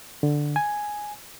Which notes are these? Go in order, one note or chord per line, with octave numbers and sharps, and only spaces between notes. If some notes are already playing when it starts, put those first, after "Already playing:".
D3
G#5